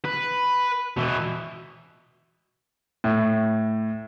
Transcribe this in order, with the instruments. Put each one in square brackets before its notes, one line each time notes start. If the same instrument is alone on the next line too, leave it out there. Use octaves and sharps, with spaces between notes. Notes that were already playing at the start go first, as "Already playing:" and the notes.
[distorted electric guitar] B4
B2 E3
[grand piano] A2